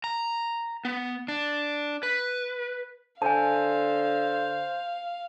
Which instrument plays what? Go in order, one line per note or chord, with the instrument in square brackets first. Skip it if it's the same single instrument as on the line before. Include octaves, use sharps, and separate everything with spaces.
[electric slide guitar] A#5
B3
D4
B4
[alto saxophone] D3 [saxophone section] C5 [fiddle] F5 [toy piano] G#5 A5